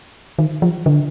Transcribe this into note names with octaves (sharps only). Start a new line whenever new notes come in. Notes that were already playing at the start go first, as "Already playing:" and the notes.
D#3
F3
D3